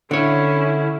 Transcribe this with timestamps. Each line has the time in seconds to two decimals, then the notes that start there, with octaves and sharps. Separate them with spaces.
0.11 D3 C#4 E4 C#5